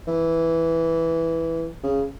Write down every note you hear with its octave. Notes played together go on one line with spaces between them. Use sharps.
E3
C#3